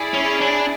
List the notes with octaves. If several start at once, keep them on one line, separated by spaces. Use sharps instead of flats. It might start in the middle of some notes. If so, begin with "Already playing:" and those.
Already playing: E4 G#4 D5
C#4
D4